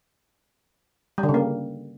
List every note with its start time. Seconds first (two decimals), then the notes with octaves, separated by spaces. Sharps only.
1.18 G3
1.23 D3
1.29 C#3
1.34 A#3